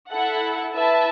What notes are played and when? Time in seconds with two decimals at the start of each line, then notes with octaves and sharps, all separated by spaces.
0.11 E4 A4 F#5
0.74 E4 B4 E5 A5